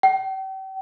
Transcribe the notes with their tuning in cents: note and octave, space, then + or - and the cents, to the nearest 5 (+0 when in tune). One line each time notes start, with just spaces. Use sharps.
G5 -40